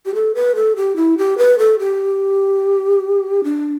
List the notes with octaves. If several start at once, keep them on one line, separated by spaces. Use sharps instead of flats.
G4
A4
B4
A4
G4
E4
G4
B4
A4
G4
D4